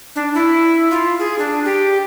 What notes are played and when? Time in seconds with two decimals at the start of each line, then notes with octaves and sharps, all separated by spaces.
0.16 D4
0.34 E4
0.91 F4
1.19 G#4
1.39 D4
1.65 G4